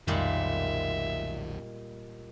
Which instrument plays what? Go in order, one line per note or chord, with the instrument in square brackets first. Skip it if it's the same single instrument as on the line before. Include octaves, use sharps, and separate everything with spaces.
[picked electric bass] B1 D#3 [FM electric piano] F2 [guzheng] A#2 G3 G#3 [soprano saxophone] E5